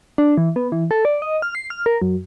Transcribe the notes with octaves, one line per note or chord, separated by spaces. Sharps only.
D4
E3
B3
E3
A4
D5
D#5
F6
C7
F6
A#4
F#2